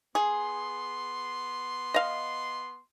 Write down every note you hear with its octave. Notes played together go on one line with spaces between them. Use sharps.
B3 G#4 C6
D#5 F5